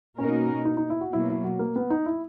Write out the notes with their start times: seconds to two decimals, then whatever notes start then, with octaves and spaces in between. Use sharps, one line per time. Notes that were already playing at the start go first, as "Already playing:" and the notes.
0.18 B2 A#3 C#4 D#4 F#4 A#4
0.65 D#4
0.77 D#4
0.90 E4
1.01 F#4
1.13 B2 F#3 A#3 E4
1.29 E4
1.44 F#4
1.59 A#3
1.76 B3
1.90 D#4
2.06 E4